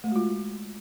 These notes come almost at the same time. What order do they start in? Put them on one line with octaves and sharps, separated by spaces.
A3 G#3 F#4 F4